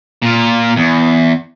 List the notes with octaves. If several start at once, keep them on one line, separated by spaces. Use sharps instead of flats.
A#2 F4
E2